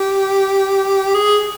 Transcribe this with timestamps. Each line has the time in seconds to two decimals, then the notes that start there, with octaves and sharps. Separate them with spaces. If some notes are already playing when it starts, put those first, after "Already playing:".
Already playing: G4
1.15 G#4